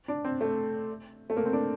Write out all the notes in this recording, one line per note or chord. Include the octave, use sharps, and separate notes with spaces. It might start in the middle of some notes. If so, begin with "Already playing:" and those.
D4
C4
A3
A3
A#3
C4
D4